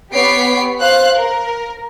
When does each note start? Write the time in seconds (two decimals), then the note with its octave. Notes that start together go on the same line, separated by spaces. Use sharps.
0.13 B3 G4 C#5 B6 C7 D7
0.81 C5 F5 F#6
1.18 A#4